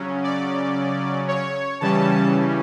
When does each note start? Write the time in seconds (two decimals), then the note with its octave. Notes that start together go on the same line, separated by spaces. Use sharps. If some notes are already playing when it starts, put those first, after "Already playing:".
Already playing: C#3 F#3 C#4
0.23 D5
1.28 C#5
1.80 C#3 E3 G3 C#4 A5